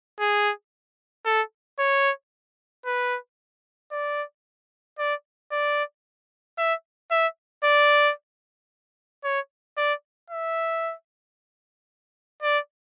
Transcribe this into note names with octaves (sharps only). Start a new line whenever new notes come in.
G#4
A4
C#5
B4
D5
D5
D5
E5
E5
D5
C#5
D5
E5
D5